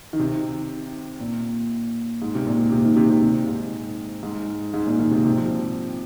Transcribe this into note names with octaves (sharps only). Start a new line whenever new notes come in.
D#3
C3
A#2
G#2
C3
A#2
C3
D#3
C3
C3
C3
G#2
G#2
G#2
A#2
D#3
C3
C3
F3